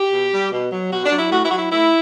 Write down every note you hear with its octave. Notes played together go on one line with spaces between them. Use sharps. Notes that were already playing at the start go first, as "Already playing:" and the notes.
Already playing: G4
B2
G3
B2
F#3
B2 F#4
D4
F#3
E4
A2 F#4
E4
F#3 F#4
E4
A2 E4